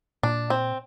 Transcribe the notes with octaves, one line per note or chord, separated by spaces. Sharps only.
A#2 D4
C4